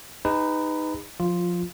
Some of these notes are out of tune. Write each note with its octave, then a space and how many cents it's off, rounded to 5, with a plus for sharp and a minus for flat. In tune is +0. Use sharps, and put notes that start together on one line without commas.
D#4 +0 G#4 -40 B4 +20
F3 +25 F4 +0